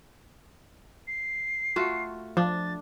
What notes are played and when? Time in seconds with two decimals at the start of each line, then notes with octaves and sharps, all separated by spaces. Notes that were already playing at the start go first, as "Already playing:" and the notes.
1.07 C7
1.76 A3 F4 F#4
2.37 F3 D4 A6